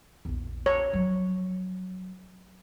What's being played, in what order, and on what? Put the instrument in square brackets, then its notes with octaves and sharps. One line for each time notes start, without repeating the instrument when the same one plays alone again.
[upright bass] A#1 E2
[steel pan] C#5
[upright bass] F3 F#3